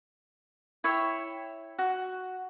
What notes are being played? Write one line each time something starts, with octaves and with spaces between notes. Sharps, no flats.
E4 C#5 E5 G5
F#4